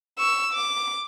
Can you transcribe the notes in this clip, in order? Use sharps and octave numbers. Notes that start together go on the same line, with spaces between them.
C#6 E6
D6